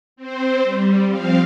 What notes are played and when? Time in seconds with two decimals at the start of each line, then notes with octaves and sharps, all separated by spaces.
0.16 C4 C5
0.63 G3
1.09 F3 C4 F5